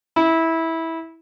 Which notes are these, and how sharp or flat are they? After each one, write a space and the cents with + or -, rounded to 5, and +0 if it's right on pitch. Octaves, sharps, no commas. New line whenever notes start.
E4 -15